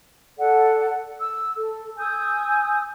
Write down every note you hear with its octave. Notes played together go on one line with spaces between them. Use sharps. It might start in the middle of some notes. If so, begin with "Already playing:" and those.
A4 D5 F#5
E6
A4
G#5 D#6 E6 G6